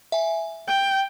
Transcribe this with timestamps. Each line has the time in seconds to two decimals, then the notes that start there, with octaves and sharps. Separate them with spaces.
0.12 E5 G#5
0.68 G5